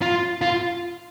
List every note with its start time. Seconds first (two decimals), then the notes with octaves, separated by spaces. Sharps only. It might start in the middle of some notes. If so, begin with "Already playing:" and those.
0.02 F4
0.42 F4